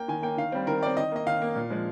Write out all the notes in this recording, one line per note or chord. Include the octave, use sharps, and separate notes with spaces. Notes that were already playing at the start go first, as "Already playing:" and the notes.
Already playing: A#3 G5
D#3 G#5
A#3 G5
D#3 F5
G3 C4
D#3 A#4
G3 C4 D5
D#3 D#5
A#3 D#5
D#3 F5
A#3
A#2
F3 G#3